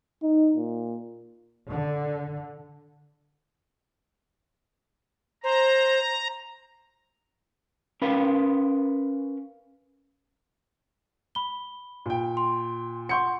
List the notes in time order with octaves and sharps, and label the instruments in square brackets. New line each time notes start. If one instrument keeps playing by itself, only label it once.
[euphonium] D#4
A#2
[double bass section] D3
[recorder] C5 [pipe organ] A#5
[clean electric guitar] C#4 A#4 B4 F5 B5
[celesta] B5 G7
[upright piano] A#2 G5
[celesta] C6
[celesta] F#5 C6 [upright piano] C#6 G6 C#7